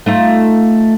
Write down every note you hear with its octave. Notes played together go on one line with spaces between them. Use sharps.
A3 D#4 F4